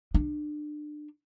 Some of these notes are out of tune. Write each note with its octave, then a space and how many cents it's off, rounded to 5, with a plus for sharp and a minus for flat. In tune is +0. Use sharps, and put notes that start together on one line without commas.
D4 +30